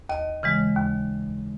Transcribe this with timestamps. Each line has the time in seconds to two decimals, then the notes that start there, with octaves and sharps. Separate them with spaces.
0.09 D#2 D#5
0.43 C#3 E3 G#3
0.76 D#2